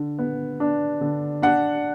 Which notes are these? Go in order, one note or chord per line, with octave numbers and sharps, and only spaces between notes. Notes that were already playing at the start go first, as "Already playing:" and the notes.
Already playing: D3
B3
D4
D3
D4 F#5